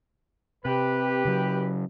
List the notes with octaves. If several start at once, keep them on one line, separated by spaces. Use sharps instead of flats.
C3 G4 B4
C#3 F#3